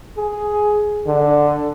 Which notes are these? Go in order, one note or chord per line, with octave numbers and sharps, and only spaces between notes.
G#4
D3